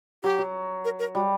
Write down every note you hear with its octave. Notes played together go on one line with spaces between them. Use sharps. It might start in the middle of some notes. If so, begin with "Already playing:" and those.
F#3 G4
F#3
A#4
A#4
G3 F#4